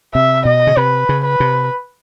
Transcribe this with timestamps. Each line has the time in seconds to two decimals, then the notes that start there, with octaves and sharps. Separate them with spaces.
0.14 C3 E5
0.45 B2 D#5
0.67 C#3
0.77 C3 B4
1.09 C#3
1.25 B4
1.40 C3